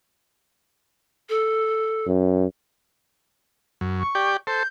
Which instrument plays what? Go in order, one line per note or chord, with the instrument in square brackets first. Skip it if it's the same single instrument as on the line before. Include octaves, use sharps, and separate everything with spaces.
[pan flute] A4
[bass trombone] F#2
[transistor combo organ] F#2
[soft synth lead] C#6
[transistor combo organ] G4 D5 G5
[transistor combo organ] A4 C5 [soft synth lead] G6